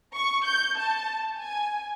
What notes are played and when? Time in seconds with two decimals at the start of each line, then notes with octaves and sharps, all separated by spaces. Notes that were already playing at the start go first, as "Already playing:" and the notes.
0.14 C#6
0.45 G6
0.77 A5
1.39 G#5